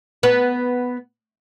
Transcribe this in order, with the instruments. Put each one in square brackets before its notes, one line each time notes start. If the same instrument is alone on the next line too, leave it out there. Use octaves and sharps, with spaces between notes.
[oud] B3 B4